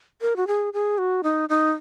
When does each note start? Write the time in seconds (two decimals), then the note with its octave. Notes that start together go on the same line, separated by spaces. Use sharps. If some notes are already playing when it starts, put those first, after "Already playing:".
0.21 A#4
0.36 F#4
0.47 G#4
0.73 G#4
0.98 F#4
1.23 D#4
1.49 D#4